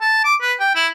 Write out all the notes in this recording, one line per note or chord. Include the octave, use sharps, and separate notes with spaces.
A5
D6
B4
G5
E4